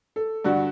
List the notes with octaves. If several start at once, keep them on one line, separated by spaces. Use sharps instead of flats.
A4
G2 D3 F#4